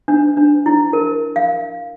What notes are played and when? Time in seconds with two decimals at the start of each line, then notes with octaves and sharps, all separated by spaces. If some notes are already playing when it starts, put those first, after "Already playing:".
0.08 D4
0.37 D4
0.66 E4
0.93 A#4
1.36 F5